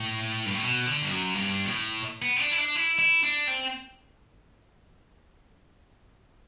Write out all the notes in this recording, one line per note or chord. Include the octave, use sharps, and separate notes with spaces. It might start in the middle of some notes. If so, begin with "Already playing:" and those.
Already playing: A2
G2
A2
B2
D3
G2
F#2
G2
B2
A2
B3
C4
D4
E4
D4
E4
E4
D4
C4